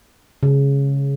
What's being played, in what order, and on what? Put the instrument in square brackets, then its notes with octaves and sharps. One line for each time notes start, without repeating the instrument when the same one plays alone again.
[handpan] C#3